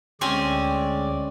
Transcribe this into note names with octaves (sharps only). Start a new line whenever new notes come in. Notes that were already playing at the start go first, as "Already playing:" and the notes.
D2 G#3 C4 C#4 D5 G#5